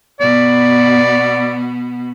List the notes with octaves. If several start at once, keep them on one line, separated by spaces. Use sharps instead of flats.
B2 B3 D5